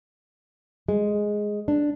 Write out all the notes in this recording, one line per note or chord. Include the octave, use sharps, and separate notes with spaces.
G#3
D4